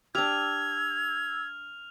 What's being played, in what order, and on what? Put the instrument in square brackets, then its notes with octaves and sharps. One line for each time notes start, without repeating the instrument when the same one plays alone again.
[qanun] D4 G4 [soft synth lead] E6 [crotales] F6 F7 [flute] G#6